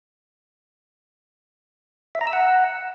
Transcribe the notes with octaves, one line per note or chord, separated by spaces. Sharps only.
E5
A#5
E6
F#5